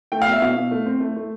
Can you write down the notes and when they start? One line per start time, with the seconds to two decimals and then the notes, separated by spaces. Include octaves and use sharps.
0.12 A3 G5
0.22 B2 F5
0.32 E5
0.42 B2 F5
0.56 B2
0.71 A3
0.86 C4
1.00 A3
1.16 A3